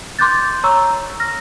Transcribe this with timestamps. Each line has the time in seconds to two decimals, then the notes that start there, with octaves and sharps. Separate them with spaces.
0.19 C6 D6 F#6 G6 A6
0.64 C#5 A#5 C#6 E6
1.20 F6 A#6